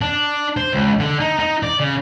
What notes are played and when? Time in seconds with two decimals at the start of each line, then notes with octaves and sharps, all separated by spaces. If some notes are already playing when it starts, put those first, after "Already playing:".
0.01 D4
0.57 C5
0.73 C#2
1.00 D3
1.20 D#4
1.39 D#4
1.63 D5
1.80 C#3